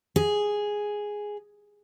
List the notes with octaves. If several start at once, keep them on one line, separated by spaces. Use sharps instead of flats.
G#4